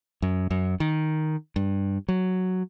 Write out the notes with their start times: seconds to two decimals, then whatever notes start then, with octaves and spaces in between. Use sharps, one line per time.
0.22 F#2
0.51 F#2
0.80 D#3
1.56 G2
2.08 F#3